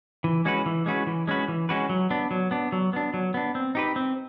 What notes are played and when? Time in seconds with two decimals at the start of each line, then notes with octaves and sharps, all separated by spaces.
0.24 E3
0.45 G#3 C#4 F#4 B4
0.66 E3
0.86 G#3 C#4 F#4 B4
1.07 E3
1.27 G#3 C#4 F#4 B4
1.48 E3
1.69 G#3 C#4 F#4 B4
1.89 F#3
2.10 B3 D4
2.31 F#3
2.51 B3 D4
2.72 F#3
2.93 B3 D4
3.14 F#3
3.34 B3 D4
3.55 C4
3.75 D#4 G4 B4
3.96 C4